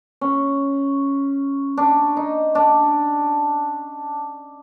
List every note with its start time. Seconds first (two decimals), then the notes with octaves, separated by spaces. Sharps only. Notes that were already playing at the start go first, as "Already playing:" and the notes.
0.21 C#4
1.77 D4
2.17 D#4
2.55 D4